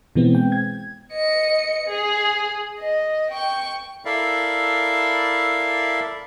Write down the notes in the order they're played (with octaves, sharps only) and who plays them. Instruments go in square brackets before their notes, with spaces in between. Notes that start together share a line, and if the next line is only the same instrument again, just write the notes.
[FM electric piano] B2 E3 G#3 B3 C4
G5
G#6
[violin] D#5 C#7
G#4
D#5
G5 C#6
[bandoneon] E4 A4 A#4 D5 E5 F5